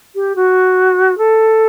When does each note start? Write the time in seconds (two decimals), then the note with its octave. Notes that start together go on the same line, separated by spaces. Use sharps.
0.15 G4
0.36 F#4
1.18 A4